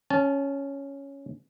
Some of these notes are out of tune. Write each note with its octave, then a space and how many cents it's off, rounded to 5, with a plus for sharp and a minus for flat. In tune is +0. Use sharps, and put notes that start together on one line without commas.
C#4 +0 A5 -25